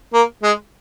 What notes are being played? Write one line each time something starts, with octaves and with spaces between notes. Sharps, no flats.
A#3
G#3